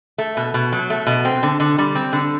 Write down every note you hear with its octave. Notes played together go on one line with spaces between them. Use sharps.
A3
B2
B2
F#3
A3
B2
C4
D3
D3
G3
C4
D3